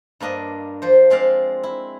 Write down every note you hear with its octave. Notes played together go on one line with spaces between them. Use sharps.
G2 A#3 D4 D#5
F3 C5
G#3 C4 D5 F5
E4